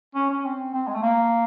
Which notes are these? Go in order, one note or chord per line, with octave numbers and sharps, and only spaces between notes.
C#4
C#4
C4
C4
G#3
A3
A#3